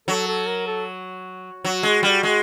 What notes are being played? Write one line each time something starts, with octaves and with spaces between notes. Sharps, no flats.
F#3 A4
A4
A#4
A4
F#3 F#4
G#3
G3
G#3